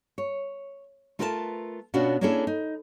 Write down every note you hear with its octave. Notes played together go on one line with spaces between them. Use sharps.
C#5
A3 F4 A#4 B4 D#5 A5
B2 B3 C#4 D4 F4 F#4
A#3 C#4 D4 E4 G#4 A4
D#4